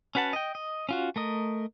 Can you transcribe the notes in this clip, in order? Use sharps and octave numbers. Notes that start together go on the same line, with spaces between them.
C#4 F#4 B4 F#5 A5
D#5 G5
D#5
C#4 F4 F#4
A3 A#4 D#5